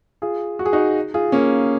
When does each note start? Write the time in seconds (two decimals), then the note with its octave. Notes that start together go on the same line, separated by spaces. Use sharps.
0.22 F4 G#4
0.59 F#4
0.66 G#4
0.73 D#4 F#4
1.14 F4 G#4
1.32 A#3 C#4